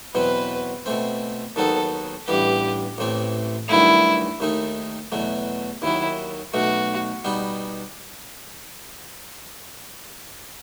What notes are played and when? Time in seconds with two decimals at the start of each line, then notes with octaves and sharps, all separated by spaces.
0.14 E2 B2 F#3 C4 B4
0.86 B2 A3 C4
1.56 D#2 D#3 F#3 B3 D#4 A4
2.27 A1 G2 E3 B3 G4
2.98 A1 A2 E3 A3 C4
3.69 G2 D#3 F#3 A3 E4
4.40 D#2 D#3 A3 D#4
5.12 E2 B2 F#3 A3
5.82 D#2 D#3 F#3 E4
6.53 B1 B2 A3 F#4
7.24 B2 G3 B3 D#4